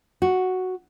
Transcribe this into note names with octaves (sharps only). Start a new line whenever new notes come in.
F#4